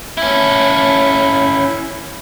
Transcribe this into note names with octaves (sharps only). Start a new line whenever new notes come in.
C#4 E4